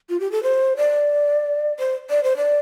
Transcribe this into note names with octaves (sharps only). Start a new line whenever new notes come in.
F4
G4
A4
C5
D5
C5
D5
C5
D5